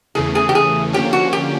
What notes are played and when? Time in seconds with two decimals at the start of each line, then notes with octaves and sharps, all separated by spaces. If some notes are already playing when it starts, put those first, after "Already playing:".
0.15 E2 C#3 E3 A3 G#4
0.35 G#4
0.49 G4
0.55 G#4
0.93 D3 F3 A#3 C#4 G4
1.13 F#4
1.33 G4